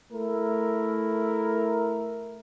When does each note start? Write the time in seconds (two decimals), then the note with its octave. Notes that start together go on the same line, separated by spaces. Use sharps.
0.12 A3 E4 A#4